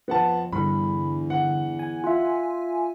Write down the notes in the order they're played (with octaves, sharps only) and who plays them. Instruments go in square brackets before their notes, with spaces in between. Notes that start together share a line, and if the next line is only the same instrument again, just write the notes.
[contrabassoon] F2 [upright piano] B3 F#5 A5
[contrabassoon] E2 [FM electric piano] G2 D3 [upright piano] B5
[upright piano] F#5
[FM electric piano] G#5
[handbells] F4 E5